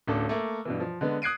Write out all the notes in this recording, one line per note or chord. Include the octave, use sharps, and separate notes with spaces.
D1 C#4 D4 A4
A3 A#3
G2 B2 E3
F3
D3 G#3 B3
D#6 F#6 G#6 C7 D7 D#7